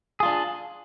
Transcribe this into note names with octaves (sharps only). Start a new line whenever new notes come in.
D4 F4 G#4